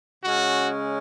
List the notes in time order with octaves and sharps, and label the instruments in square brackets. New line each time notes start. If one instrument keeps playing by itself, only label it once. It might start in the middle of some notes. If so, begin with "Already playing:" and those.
[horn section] C#3 G#3 C#4 F#4